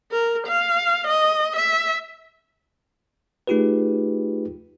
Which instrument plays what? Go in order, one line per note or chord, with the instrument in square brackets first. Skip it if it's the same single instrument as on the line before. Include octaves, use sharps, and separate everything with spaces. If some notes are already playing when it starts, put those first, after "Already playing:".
[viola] A#4
F5
D#5
E5
[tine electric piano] A3 D#4 F4 G4 G#4 B4